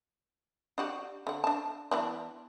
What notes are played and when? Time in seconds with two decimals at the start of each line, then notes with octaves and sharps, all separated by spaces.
0.78 D4 F#4 G4
1.27 D3 F#5
1.44 D4 A5
1.91 E3 B3 D4